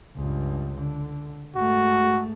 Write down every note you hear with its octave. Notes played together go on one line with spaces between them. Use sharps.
C#2 G2
D3
G#2 A3 F#4